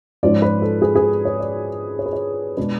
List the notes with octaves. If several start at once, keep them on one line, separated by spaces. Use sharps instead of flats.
G#2 F3 G#3 C#4 F4 D5
B4
A4
G#4
G#4
C#5
D5
C#5
B4
C#5
B2 G#3 D4 B4